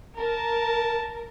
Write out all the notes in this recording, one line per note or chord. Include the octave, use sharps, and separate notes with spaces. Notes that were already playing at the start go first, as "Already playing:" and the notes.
A#4 A5